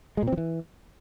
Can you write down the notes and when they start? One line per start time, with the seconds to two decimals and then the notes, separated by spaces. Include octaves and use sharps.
0.17 G#3
0.22 A#2
0.27 C4
0.32 F3
0.37 E3